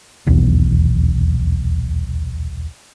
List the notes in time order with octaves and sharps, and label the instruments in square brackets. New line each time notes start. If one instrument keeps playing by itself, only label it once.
[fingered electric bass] D#1 B1 E2